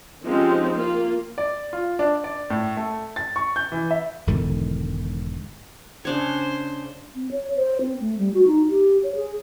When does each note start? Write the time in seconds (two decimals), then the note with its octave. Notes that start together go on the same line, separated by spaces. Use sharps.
0.24 F3 G#3 C4 C#4 D#4 G4
0.75 A#3 F4
1.38 D5
1.73 F4
1.99 D4
2.24 D5
2.50 A2
2.77 A3
3.16 A6
3.36 C#6
3.56 G6
3.72 E3
3.91 E5
4.27 E1 G#2 D3 D#3
6.05 C#3 D4 C5 C#5
7.16 C4
7.31 C#5
7.56 C5
7.81 C4
8.01 A3
8.18 G3
8.34 F#4
8.47 D#4
8.70 G4
9.03 C#5
9.15 G#4